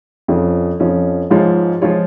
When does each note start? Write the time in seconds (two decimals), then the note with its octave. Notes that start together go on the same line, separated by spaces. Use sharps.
0.28 F2 F3 C#4
0.80 F2 F3 C#4
1.30 G#2 F3 G#3 F4 C#5
1.82 F3 G#3 F4 C#5